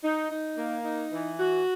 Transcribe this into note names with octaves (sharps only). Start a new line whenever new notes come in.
D#4
D#4
A#3
D#4
E3
F#4